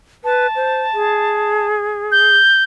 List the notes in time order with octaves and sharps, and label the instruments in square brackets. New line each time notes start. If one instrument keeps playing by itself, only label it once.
[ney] B4 [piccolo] A5
[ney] C5
G#4
[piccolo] G6